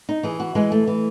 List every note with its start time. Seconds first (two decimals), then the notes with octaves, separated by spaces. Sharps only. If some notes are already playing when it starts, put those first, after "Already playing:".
0.09 D#4
0.23 E3 G#4
0.40 F#4
0.55 E3 G#3
0.72 A3
0.87 E3